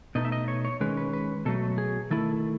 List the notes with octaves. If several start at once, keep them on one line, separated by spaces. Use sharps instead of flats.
B2 A3 D#4 D#5
E5
D#5
C#5
C#5
D#3 G#3 C#4 B4
B4
B4
B2 F#3 A3 A4
G#4
D#3 A3 E4 A4